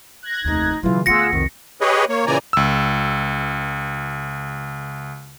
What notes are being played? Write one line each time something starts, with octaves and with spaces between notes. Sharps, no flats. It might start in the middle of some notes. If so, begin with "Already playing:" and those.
F#6 G#6 A#6
F1 D#2 D#4
C#3 E3 F#3 F4
D2 B3 F4 G#4 F#5 E6 A#6 C#7
C2 F2 D#3
G4 G#4 B4 C#5 D#5
A#3 C#5
A#2 C#3 E3 D5 G#5 A#5
C#2 E6